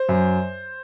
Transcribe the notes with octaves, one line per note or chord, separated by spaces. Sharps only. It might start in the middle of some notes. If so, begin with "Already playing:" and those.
Already playing: C5
F#2